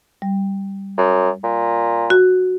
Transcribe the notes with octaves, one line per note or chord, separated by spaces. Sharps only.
G3
F#2
A#2
F#4